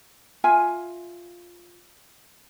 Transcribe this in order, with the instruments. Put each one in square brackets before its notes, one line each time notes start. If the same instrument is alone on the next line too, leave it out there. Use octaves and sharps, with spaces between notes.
[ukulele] F4 E5 G#5